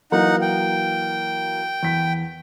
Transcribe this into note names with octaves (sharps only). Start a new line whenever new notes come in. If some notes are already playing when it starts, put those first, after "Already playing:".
E3 F#3 A#3 D#4 F#5
G5
E2 B6